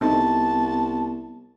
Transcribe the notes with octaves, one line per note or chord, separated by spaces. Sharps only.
C2 B3 C4 D#4 A4 A5